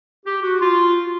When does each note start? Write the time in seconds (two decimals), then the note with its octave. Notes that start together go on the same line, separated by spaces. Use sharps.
0.25 G4
0.42 F#4
0.60 F4